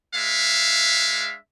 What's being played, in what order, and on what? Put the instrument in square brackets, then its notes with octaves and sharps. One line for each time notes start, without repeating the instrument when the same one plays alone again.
[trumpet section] G#3 D4 E5 F5